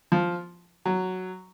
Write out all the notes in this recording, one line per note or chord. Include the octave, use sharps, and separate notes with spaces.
F3
F#3